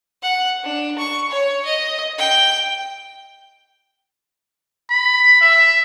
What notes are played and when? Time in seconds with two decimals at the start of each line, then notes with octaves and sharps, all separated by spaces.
0.22 F#5
0.64 D4
0.98 C#6
1.30 C#5
1.65 D#5
2.18 G5
4.90 B5
5.41 E5